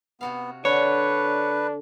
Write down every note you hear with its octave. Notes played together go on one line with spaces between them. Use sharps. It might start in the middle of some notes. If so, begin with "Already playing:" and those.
C3 B3 F#4 F5
D3 D4 B4 C#5